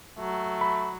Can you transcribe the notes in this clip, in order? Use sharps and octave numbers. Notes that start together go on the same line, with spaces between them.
F#3 A3
B5